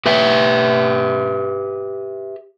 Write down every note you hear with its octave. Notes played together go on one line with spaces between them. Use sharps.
G4 B4 E5